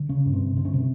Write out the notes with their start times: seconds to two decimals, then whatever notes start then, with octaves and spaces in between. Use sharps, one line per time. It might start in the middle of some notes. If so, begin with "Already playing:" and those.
Already playing: D3
0.09 C#3 C#4
0.26 G2
0.33 C3 C4
0.56 D3 C4
0.65 C#4
0.73 C3 C4